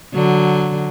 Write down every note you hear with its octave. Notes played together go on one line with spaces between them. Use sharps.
D3 F#3